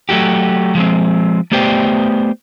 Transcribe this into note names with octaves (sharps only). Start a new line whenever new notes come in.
F#3 A3 F#4 G4
F3 G#3 C4
A3 B3 G4 C5 D5 G5